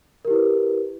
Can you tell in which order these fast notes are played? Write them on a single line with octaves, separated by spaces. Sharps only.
A#4 G4 E4 B4